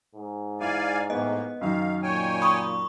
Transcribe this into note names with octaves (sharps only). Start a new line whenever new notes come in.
G#2
E4 D5 F5 G#5
A2 A#3 B3 D#5
F#2 D#3 F5
A#2 C#5 G5 G#5
B5 C#6 D#6